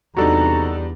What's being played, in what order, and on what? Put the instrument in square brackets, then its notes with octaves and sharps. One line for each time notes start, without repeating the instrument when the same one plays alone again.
[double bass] E2 [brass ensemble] C3 A#5 [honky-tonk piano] G3 D4 D#4 [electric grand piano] F#4 A4